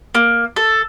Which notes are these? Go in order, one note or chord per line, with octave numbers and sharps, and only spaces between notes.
A#3
A4